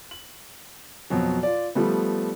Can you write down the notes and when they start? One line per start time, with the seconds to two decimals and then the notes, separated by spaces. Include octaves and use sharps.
0.11 F#7
1.10 F2 B2 F#3
1.43 F4 D5
1.75 F3 G3 A3 B3